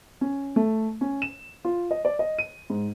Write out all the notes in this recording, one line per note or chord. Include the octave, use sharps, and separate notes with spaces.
C#4
A3
C#4
E7
F4
D#5
D5
D#5
D#7
G#2